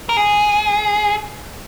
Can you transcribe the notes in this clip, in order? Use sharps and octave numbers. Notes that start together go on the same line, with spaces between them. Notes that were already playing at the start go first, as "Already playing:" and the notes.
A#4
G#4